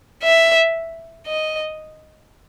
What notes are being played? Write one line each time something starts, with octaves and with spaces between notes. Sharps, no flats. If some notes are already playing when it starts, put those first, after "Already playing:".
E5
D#5